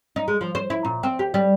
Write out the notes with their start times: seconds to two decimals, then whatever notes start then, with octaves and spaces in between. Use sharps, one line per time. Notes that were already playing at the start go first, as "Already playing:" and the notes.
0.16 D#4
0.28 G#3
0.41 F3
0.55 C5
0.70 E4
0.85 A#2
1.03 C4
1.19 G4
1.34 G3